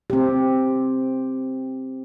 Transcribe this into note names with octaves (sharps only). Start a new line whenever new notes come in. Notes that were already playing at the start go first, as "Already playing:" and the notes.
C4 G4